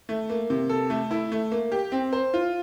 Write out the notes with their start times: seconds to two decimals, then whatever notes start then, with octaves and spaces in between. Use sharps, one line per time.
0.09 A3
0.30 A#3
0.50 C3
0.69 A4
0.90 A3
1.11 E4
1.32 A3
1.52 A#3
1.72 G4
1.92 C4
2.13 C5
2.34 F4